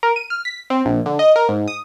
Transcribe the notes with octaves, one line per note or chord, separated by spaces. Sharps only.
A#4
D#7
F6
B6
C4
A#1
D3
D#5
A#4
G#2
D#6